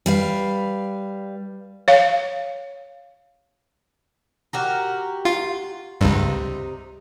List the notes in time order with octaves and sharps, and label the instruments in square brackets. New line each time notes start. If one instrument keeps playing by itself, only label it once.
[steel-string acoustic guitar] G3 B4 F5
[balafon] C#5 F5
[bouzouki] F#4 G4 A#4
[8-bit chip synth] F4
[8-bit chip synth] C#2 G2 [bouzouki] C3 D#4